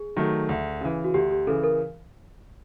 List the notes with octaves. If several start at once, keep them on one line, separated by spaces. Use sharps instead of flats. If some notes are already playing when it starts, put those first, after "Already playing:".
Already playing: G#4
D#3 F#3 A3
D2
C#3 E3
F#4
D2 G4
G4
C#3 E3 A4
A#4